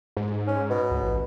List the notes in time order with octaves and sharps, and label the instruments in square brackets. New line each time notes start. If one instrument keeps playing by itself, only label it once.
[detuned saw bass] G#2
[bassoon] C#4
B2
[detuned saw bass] C#2
A1